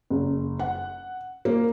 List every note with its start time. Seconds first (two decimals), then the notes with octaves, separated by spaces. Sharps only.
0.10 F#1
0.59 F#5
1.45 A#3